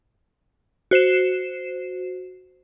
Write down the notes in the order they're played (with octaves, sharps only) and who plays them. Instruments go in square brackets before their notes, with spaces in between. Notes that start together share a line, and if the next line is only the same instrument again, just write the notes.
[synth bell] F#4 C5 C7 E7